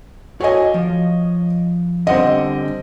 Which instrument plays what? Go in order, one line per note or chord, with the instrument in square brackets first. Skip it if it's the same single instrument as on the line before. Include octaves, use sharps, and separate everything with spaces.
[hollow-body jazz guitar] F#4 A4 G#5 [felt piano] C#5 D#5
[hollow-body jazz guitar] F3
[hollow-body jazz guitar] D3 G3 F#5 [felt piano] C4 D#5